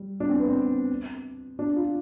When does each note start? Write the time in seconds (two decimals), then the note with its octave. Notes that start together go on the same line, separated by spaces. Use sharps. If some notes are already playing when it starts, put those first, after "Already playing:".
Already playing: G3
0.20 D4
0.29 C4
0.39 B3
0.48 C4
1.59 D4
1.76 F4